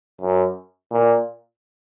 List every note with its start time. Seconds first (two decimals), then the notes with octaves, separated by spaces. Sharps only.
0.21 F#2
0.92 A#2